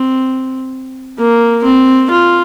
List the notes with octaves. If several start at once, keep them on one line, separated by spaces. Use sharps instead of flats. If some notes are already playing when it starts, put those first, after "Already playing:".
Already playing: C4
A#3
C4
F4